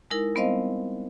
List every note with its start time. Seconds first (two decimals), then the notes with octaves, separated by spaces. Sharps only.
0.10 G#3 D#4 E4 A#4
0.35 G3 B3 C4 C5 D#5 F5